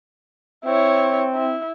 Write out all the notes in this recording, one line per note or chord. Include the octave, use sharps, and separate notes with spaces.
C4 E4 C#5
E4